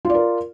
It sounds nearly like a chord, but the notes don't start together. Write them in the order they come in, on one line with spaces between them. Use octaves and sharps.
F4 D5 A#4